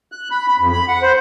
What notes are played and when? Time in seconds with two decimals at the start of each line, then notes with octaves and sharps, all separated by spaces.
0.12 F#6
0.31 B5
0.48 B5
0.59 F2
0.72 B5
0.88 F#5
1.02 C5